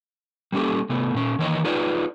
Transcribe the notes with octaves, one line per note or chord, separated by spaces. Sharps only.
G3 A#3 C#4 E4 G4 A4
C3 A3 B3
A#2 C#4
D#3 E3 C#5 D#5
D#4 F4 G#4 B4 C#5 D5